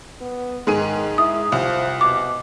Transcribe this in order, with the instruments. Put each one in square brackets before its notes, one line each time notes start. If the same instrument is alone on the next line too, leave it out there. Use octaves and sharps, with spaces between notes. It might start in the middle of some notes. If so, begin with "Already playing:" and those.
[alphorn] B3
[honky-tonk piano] G#2 G#4 D#7 [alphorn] D#3
[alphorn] E4 [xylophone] D#6
[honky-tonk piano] C2 [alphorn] F3
[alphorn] B2 [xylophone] D6